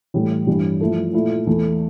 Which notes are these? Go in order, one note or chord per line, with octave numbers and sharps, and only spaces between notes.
A2 E3 G3
G2 E3 G3
F3 A3 E4 A4
A#2 A3 E4
E2 E3 A3